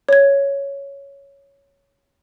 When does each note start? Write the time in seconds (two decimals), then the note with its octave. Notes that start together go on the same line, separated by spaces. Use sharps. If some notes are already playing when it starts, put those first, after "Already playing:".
0.09 C#5 G#6